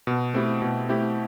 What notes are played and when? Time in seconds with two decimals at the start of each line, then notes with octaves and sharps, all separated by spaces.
0.07 B2
0.34 A3 C4 E4 G4
0.62 B2
0.89 A3 C4 E4 G4